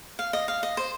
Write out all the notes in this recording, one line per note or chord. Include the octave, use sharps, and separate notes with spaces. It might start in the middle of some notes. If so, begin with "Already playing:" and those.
F5
D#5
F5
D#5
C5